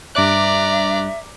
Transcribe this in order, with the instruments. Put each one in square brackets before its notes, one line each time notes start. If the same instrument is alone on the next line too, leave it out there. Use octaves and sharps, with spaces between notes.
[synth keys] G2 D6 F#6 [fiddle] D5 A#5 [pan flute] E5